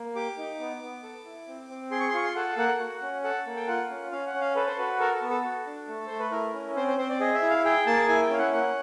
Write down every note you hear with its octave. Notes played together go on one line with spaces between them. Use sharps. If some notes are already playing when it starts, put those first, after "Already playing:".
Already playing: A#3
G4 D6
D#4
B3
B3
A4
E4
C4
C4
G#4 C6
C#6
C6
F4 C#6
C6
A4 F#5
A#3 F#5
F#4
C#4
A4 F#5
A#3
G5
F4 F#5
C#4
C#4 F5
F#5
C#4
F5
A4 B4
C5
F#4 B4
A4 A#4
A4
B3
A4
F#4
D4
A3
A3 C5
B4
E4 A#4
C#4
C4 C5
C5
C4 C5
D5
G#4 D#5
E5
E4
F5
G#4 G5
A#3 A5
E4 G#5
G5
C#4 F5
F#5
A#3 F#5